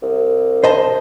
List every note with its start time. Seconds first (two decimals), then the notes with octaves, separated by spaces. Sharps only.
0.02 C2
0.64 C5 D#5 A5